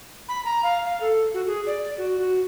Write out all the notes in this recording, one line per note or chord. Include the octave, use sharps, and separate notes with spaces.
B5
A#5
F5
F5
A4
F#4
G#4
D5
F#4
F#4